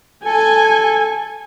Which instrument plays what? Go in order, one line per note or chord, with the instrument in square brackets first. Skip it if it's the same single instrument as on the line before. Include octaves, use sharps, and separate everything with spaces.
[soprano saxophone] A4 [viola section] G#5